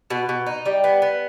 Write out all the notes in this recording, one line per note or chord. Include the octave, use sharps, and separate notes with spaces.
B2
B2
D#4
G3
B3
B3